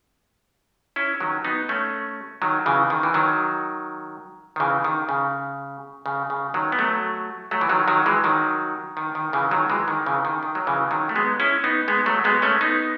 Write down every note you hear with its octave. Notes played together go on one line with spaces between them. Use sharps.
C#4 E4
D#3 F#3
B3 D#4
A3 C#4
D#3 F#3
C#3 E3
D#3
E3
D#3 F#3
D#3
C#3 E3
D#3
C#3
C#3
C#3
D#3 F#3
B3
F#3 A3
F#3 A3
E3
D#3 F#3
D#3 F#3
E3 G#3
D#3 F#3
D#3
D#3
C#3 E3
D#3 F#3
E3 G#3
D#3
C#3 E3
D#3
D#3
F#3
C#3 E3
D#3 F#3
A3
G#3 B3
C#4 E4
B3 D#4
G#3 B3
F#3 A3
G#3 B3
A3 C#4
B3 D#4